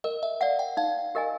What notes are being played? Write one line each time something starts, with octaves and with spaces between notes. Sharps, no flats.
A#4 D#5
E5
D5 F5 F#5
G5
D#4 F5
G4 A#4 D#5 G#5